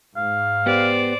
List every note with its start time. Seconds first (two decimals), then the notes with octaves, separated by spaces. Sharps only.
0.17 G#2 F5
0.66 B3 G4 C5 D5